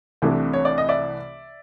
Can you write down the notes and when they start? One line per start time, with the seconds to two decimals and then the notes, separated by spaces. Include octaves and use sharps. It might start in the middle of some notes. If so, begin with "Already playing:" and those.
0.22 C2 C3 E3 A3 D4
0.53 C#5
0.65 D5
0.78 D#5
0.89 D5 E5